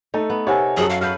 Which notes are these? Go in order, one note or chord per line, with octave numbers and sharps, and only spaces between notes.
A3 D#4 A4
B3
C3 D#4 A4 A#4 C#5 F#5 G#5
F#2 C#4 F#4 G#4 A4 F#7
F5
G#4 A4 B4 F5 F6 G6